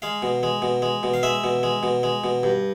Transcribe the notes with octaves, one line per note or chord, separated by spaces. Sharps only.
G#3 F5
B2
G#3
B2
G#3
B2
F5
G#3 E5
B2
G#3
B2
G#3
B2
G2